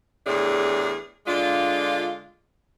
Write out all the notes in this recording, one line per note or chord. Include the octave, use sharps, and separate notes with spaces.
E2 A2 D4 G4 G#4
D3 G#3 D4 F4